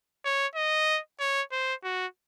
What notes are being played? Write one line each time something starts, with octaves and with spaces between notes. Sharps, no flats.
C#5
D#5
C#5
C5
F#4